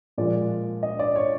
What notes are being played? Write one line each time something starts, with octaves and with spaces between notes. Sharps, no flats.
A#2 F3 G#3 D5
D#5
D5
C#5